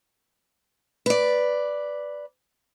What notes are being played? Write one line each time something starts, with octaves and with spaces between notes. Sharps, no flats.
B4 D5